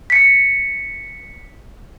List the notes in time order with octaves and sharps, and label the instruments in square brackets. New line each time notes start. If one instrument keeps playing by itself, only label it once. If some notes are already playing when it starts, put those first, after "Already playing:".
[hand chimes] B6 C#7